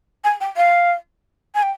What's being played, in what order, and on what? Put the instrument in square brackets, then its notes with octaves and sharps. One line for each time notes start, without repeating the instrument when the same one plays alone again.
[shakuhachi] G#5
G5
F5
G#5
G5